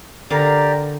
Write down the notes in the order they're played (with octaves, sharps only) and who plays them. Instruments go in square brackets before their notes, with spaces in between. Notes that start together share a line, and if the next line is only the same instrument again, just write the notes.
[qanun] D3 A#4 F5 [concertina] G4 D5 [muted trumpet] A#5